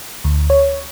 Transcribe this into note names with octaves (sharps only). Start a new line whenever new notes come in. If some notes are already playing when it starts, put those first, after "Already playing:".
D2
C#5